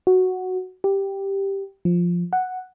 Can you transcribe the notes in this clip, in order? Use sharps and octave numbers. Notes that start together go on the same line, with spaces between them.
F#4
G4
F3
F#5